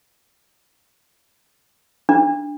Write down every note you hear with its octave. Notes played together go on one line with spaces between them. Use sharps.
D4